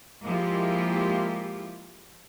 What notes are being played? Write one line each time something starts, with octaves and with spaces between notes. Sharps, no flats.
F3 G#3 A#3 E4 F4 G4